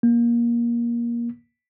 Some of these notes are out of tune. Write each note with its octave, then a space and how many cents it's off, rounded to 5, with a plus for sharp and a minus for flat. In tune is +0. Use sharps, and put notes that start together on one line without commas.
A#3 +20